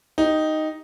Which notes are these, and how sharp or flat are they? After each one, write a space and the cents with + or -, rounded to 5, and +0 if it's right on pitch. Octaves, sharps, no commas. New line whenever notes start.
D#4 +0 G4 +0